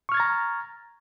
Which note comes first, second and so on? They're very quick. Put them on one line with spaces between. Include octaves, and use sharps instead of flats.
C#6 F6 G#6 A6 A#5